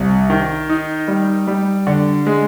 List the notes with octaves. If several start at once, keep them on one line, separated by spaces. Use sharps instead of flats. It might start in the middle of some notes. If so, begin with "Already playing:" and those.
Already playing: C2
D#3
D#4
G3
G3
D3
G#3